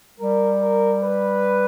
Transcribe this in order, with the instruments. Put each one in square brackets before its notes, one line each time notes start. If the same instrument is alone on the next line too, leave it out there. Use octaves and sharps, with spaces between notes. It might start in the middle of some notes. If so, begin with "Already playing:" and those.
[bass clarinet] G3 [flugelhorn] A#4
[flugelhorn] A#4
B4